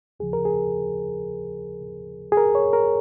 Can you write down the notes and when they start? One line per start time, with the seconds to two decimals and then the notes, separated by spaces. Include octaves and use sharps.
0.20 D#2 C#3 F3 G#4
0.33 A#4
0.45 G#4
2.32 G#4
2.37 A#4
2.55 C#5
2.73 A#4